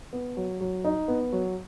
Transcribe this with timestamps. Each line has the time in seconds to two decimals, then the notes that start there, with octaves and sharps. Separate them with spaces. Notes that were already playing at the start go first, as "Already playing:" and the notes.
0.13 B3
0.37 F#3
0.61 F#3
0.85 D#4
1.08 B3
1.32 F#3